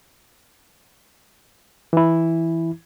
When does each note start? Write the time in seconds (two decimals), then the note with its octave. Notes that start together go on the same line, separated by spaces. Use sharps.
1.93 E3 E4